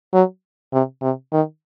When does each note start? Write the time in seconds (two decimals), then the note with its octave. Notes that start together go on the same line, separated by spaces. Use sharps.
0.13 F#3
0.73 C3
1.02 C3
1.32 D#3